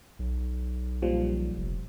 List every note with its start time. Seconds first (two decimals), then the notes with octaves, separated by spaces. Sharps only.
0.19 B1
1.02 A#2 F3 G3
1.57 F1